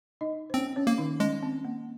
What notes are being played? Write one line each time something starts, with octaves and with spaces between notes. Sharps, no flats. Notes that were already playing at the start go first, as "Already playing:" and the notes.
D#4 D#5
C5
C4 C#4 C#5
C#4 C#5
A#3
D#3 D#4
G#3 C#4
C4
A#3